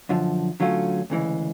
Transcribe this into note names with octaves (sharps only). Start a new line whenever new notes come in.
F#2 D3 F3
D3 F#3 A3 C#4 F4
D2 C#3 E3 G#3